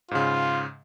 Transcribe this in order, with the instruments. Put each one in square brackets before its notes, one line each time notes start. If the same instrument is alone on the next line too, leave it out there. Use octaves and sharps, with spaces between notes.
[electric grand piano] G#2 C#3 [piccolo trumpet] F4